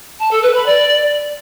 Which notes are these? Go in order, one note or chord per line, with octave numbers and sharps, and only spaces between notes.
A5
A4
B4
B5
D5